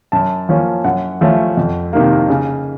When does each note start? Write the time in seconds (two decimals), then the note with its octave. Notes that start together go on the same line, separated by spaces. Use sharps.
0.12 F#2 A5
0.49 F3 A#3 C#4
0.84 F#2 F#5
1.21 F3 A3 C#4
1.57 F2
1.93 C3 D#3 A#3
2.29 C#3